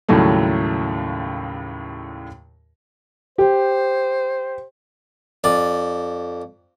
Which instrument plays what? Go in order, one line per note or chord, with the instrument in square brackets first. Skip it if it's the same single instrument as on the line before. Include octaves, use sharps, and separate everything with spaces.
[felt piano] D#2 A2 C#3 F#3 G3 A3
[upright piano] G4 [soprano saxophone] C5
[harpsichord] F2 D5